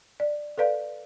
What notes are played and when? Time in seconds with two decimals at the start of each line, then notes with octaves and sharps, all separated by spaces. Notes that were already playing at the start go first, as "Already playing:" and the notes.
0.20 D5
0.58 A4 B4 D5 F5